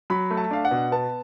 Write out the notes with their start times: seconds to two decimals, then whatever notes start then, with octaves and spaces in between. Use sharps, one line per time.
0.10 F#3 B5
0.31 A3
0.37 A5
0.51 D4 F5
0.65 F#5
0.71 B2
0.92 B3 A5